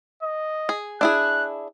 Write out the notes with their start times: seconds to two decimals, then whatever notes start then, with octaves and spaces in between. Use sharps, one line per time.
0.23 D#5
0.69 G#4
1.01 D4 E4 G#4 F#6